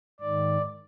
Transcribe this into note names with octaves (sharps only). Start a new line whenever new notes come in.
G#2 D#3 D5